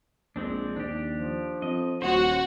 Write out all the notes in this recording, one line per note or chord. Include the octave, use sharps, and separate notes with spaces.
A#1 G#3 C4 D4
D#2 D4 G4
F3
F2 D#5
D#1 F#4 C5 C#5